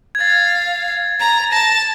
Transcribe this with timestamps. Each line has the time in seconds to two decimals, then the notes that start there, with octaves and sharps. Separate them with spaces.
0.15 G#6
0.20 F5 A6
1.20 A#5
1.52 A5 A#6